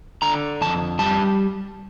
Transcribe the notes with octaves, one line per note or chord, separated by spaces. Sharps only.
D3 A#5
F2 A5
G3 A5